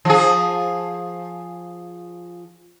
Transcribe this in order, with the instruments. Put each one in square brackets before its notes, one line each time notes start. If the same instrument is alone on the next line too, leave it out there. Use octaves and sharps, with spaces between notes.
[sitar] F3 G#4